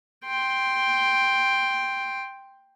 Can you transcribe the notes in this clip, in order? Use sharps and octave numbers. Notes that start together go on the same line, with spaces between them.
G5 C6